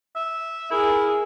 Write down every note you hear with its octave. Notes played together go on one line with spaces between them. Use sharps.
E5
E4 G#4 A#4